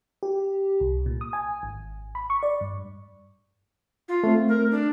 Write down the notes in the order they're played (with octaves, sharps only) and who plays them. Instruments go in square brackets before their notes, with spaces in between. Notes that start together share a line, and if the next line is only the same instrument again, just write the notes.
[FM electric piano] G4
C2
A#2
D#6
G#5
G#1
B5
C#6
D5
G2
[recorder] F4
[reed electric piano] A3 C4
[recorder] A#4
D4